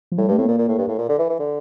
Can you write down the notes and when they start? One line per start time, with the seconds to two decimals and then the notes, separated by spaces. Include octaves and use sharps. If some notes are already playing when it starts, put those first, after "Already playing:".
0.12 F3
0.18 A2 G3
0.28 G2
0.31 A3
0.38 A2 C4
0.45 A#2 A#3
0.58 A#2
0.68 A2
0.78 G2
0.88 A2
0.99 A#2
1.09 D3
1.19 E3
1.29 E3
1.39 D3